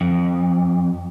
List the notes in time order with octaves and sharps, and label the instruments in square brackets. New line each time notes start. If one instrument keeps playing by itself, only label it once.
[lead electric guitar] F2